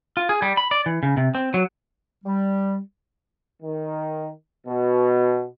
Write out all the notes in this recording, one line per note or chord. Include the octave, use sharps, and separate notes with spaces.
F4
G#4
G3
B5
D5
E3
C#3
C3
C4
F#3
G3
D#3
B2